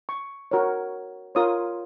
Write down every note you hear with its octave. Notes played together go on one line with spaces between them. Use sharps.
C#6
F#4 A#4 C#5
F4 A#4 C#5 D#6